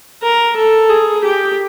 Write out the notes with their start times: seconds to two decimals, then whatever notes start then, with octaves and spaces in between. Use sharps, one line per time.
0.23 A#4
0.57 A4
0.90 G#4
1.24 G4